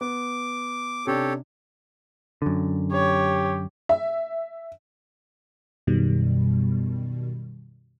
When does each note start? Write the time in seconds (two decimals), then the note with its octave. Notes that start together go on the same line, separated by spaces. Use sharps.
0.01 B3 D6
1.07 C3 C#4 D4 G4 A4 C#5
2.42 F#2 D3
2.92 G4 C#5
3.89 E5
5.87 F#2 B2 D#3 G3